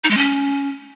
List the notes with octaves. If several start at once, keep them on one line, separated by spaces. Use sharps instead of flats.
D#4
G#3
C#4